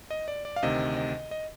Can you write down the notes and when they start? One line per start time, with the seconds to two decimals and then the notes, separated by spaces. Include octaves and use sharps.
0.11 D#5
0.28 D5
0.45 D5
0.56 F5
0.62 D2 C3 D#3 D#5
0.97 D#5
1.31 D#5